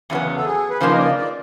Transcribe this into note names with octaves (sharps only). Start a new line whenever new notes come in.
E2 C#3 F#3 B3
A4
G#4
B4
C#3 F3 A#3 D#4 C5
D#5
D5
D5